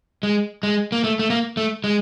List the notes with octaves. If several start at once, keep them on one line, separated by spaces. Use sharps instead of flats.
G#3
G#3
A#3
A3
A3
A#3
A3
G#3